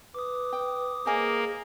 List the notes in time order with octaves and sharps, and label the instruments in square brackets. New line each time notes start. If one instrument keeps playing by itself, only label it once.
[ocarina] B4 [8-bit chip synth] D6 D#6
[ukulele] G5
[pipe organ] A#3 [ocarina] G#4 [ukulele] C5 D#5 G#5